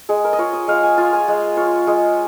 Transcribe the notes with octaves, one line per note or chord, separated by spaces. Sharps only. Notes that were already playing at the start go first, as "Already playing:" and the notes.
G#3 G#4
A#4
D#5
F4 C#5
D#5
G#3 F5
G#5
F4 G#5
G#5
G#3
F4 C#5
G#3 G#4